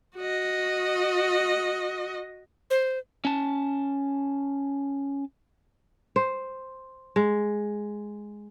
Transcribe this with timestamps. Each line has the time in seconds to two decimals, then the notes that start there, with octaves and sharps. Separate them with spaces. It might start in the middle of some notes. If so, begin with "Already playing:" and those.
0.16 F#4 D#5
2.70 C5
3.25 C#4 A5
6.16 C5
7.16 G#3